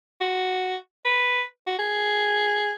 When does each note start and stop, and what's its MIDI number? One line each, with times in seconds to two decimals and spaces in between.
0.21 0.75 66
1.05 1.42 71
1.67 1.78 66
1.79 2.72 68